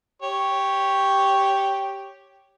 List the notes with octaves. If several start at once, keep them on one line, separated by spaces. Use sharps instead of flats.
G4 C#5